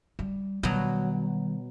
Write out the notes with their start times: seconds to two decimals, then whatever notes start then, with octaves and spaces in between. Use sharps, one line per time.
0.19 G3
0.63 B2 D#3 F#3 G3